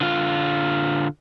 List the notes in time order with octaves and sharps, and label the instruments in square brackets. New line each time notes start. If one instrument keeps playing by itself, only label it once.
[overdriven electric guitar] D3 F4